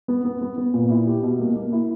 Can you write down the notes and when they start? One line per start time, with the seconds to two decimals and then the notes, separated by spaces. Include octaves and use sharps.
0.08 B3
0.25 B3
0.41 B3
0.58 B3
0.74 A#2
0.90 E4
1.07 G4
1.23 B2
1.40 A#3
1.56 A#3
1.72 E4